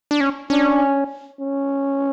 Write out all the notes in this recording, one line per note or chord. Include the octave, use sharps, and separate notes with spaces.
D4
C#4
C#4 D4
C#4